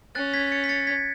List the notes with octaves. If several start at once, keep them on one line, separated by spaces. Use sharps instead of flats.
C#4 F#6 A6
G#6 B6
A6 C#7
B6
A6 C#7
G#6 B6